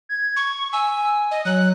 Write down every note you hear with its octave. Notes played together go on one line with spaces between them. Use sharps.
G#6
C#6
G#5 E6
D#5
F#3 F#6